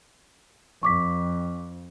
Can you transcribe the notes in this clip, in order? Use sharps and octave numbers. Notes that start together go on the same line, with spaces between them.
F2 C#6 D6 B6